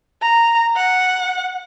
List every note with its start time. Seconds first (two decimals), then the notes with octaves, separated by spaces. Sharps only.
0.22 A#5
0.76 F#5